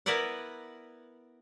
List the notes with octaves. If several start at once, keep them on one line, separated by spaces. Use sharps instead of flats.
B3 E4 A#4 B4 D5 F#5